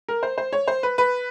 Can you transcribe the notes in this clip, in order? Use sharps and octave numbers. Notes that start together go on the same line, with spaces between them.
A#4
C5
C5
C#5
C5
B4
B4